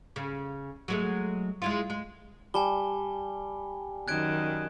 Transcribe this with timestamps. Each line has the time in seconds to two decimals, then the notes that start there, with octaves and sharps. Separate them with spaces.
0.16 C#3
0.88 F#3 G#3 A3
1.62 G#3 E4 F4
1.90 G#3
2.54 G3 G#5 A5 G7
4.08 F#2 D#3 F#6 G#6 D7